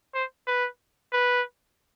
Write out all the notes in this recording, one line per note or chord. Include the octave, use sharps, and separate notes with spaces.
C5
B4
B4